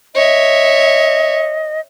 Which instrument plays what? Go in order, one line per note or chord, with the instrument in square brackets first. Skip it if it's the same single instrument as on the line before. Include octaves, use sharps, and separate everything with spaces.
[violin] C#5 E5 [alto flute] D#5